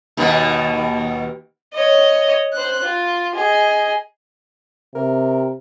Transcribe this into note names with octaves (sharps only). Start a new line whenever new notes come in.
D#2 B2 D#3
C#5 D#5
C5 F#6
F4
G#4 D#5
C3 A#4